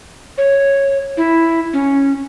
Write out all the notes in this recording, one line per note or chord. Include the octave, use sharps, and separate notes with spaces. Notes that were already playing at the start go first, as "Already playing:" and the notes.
C#5
E4
C#4